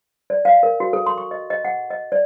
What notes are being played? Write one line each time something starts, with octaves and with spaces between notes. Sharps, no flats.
D5
F5
A#4
F#4
A4
C6
C#6
D#5
D#5
F#5
D#5
D5